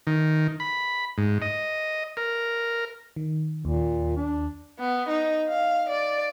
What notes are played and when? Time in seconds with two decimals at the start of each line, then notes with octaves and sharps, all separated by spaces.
0.07 D#3
0.60 B5
1.18 G#2
1.42 D#5
2.17 A#4
3.16 D#3
3.65 D#2 A#2
4.17 D4
4.79 B3
5.09 D#4
5.49 F5
5.89 D5